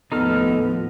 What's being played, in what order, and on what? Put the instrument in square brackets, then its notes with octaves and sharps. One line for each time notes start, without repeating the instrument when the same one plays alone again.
[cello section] D#2 A2 F3 [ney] B3 [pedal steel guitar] D#4 A4 F6